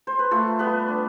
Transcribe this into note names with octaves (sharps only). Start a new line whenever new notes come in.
C5
B4
A3 F4 A4
G3 B3 B4
D4